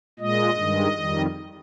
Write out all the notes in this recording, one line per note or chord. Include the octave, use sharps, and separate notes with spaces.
A#2 G#3 D#5
G2 D#3 G#3
F2 D#3 G3